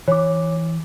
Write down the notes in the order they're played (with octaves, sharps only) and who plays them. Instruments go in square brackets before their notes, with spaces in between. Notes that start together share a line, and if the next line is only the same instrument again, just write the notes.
[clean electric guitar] E3 [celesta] C#5 D6